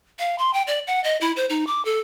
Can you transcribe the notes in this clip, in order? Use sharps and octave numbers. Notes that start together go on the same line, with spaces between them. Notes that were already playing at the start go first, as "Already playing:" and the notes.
F5
C6
G5
D5
F#5
D#5
E4
C5
D#4
D6
A4